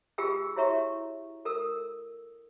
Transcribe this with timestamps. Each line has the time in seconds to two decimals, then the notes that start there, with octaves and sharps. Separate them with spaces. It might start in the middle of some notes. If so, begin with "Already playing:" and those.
0.18 F4 G4 G#4 G5 E6
0.56 E4 F#4 C#5 E5 A#5 C#6
1.45 A4 A#4 E6